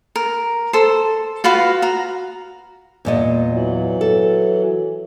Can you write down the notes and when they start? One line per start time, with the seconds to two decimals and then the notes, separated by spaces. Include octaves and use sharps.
0.16 A#4
0.73 A4 C5
1.44 F4 F#4 B4 F5
1.82 F#4 A#5
3.05 E2 A#2 D#5
3.51 E3 F#3
4.01 A4